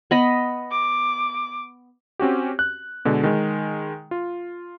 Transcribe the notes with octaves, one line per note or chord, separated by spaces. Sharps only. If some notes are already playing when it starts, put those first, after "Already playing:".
B3 D#5 B5
D6
C4 C#4 F#4 G4
F#6
B2 D3 G#3
D#3 G#3
F4